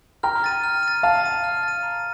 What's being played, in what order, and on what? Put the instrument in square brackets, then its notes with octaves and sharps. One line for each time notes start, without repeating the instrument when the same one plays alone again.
[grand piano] G5 A#5 [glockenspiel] F6
[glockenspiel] A6 D#7
F6
A6 D#7
[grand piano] F5 A5 [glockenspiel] F6
[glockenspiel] A6 D#7
F6
A6 D#7
A#5